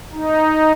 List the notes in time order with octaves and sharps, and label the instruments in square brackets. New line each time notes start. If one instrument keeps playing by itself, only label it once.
[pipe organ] D#4